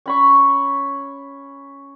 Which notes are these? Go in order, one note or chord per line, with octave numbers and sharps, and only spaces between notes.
C#4 B5 C#6